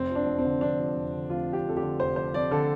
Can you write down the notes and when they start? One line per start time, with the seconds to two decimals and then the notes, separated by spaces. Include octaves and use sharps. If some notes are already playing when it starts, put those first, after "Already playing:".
Already playing: F1 C4
0.10 F3
0.15 D4
0.26 F2
0.38 C4
0.45 D3
0.61 F1 D4
0.78 F3
0.96 F2
1.13 D3
1.30 F1 F4
1.48 F3
1.53 G4
1.65 F2 A4
1.77 G4
1.82 D3
2.00 F1 C5
2.16 F3 C5
2.34 F2 D5
2.51 D3 A4